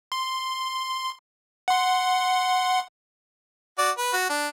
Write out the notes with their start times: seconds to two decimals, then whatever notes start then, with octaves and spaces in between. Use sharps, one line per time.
0.12 C6
1.68 F#5 C6
3.78 F#4 D5
3.98 B4
4.13 F#4
4.30 D4